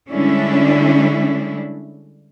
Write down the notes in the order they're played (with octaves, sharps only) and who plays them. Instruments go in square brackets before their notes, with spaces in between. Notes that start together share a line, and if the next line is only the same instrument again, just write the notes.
[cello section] D3 G3 G#3 C#4 D4 E4